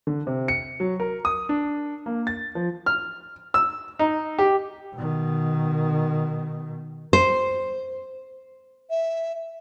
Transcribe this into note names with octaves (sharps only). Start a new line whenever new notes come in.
D3
C3
C#7
F#3
A#4
D#6
D4
A#3
A6
F3
F6
E6
D#4
G4
B2 D#3
C5
E5